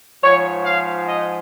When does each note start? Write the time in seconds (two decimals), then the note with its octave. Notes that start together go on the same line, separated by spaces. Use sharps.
0.22 G#2 F3 C#5
0.65 F5
1.08 D#5